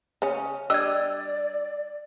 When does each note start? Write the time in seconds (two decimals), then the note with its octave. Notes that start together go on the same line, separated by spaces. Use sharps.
0.22 C#3 C#4
0.70 G3 D4 D5 D#5 E6 G#6